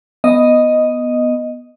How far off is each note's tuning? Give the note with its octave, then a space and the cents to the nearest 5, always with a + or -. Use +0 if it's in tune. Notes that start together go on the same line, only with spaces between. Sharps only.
B3 +0 D#5 +0